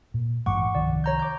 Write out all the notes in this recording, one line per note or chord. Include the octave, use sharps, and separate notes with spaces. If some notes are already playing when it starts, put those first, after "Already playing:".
A#2
A1 G2 G#3 F#5 C#6 D6
C2 D#3 F3 D5
C#5 A#5 G6
D6 G6